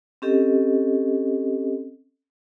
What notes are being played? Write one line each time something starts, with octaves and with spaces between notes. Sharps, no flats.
C4 C#4 G4 A4 D#5